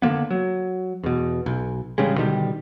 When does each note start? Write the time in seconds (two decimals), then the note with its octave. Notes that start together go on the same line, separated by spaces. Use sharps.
0.02 D3 E3 A#3 B3
0.31 F#3
1.03 E2 B2
1.46 B1
1.98 A1 C#3 G3 G#3
2.16 B2 D3 D#3 G3